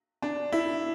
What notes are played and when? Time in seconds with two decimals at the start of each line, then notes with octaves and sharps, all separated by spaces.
0.22 D4
0.52 E4